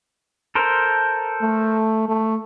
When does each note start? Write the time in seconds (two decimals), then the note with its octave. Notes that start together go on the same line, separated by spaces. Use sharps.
0.55 A4 A#4 C5
1.42 A3
2.09 A3